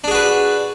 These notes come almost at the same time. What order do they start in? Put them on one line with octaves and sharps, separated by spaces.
D4 G#4 F#4 B4